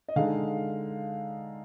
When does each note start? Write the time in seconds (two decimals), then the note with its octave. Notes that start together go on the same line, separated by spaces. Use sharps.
0.08 D#5
0.16 D3 G#3 D#4 F5